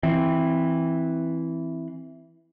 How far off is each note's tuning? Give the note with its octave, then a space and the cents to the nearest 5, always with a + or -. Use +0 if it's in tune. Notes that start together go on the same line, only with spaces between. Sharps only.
E3 +0 C4 +0